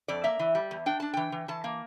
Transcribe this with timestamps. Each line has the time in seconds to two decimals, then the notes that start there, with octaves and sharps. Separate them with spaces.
0.08 F2 D5
0.24 A#3 E5
0.39 E3
0.55 G3
0.71 E2
0.86 D4 G5
1.00 D4 A5
1.14 E3 G5
1.32 E3
1.48 E3 A5
1.64 A#3